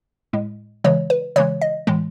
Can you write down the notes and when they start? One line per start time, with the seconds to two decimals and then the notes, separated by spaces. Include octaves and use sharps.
0.33 A2 G#3
0.84 C#3 E3 G#3 C#5
1.10 B4
1.36 C#3 E3 G#3 C#5
1.61 D#5
1.87 A2 E3 G#3